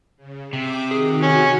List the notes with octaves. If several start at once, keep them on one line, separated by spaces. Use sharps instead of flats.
C#3
C3 G5 D6
D#3 F#4 G#4
C#4